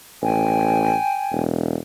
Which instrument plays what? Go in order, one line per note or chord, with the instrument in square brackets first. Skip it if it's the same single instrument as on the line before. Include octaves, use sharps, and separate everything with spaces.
[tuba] A1 [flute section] G5 G#5
[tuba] E1